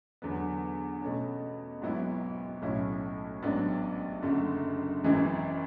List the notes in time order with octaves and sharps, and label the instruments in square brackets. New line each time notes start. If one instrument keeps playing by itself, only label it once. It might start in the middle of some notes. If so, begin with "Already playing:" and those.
[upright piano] E2 D3 F#3 B3
B2 A3 C#4
G#1 G#2 F#3 B3 E4
B1 A2 F#3 C#4 E4
A1 G#2 F#3 B3 D4
F#1 F#2 D3 A3
G#1 F#2 E3 G#3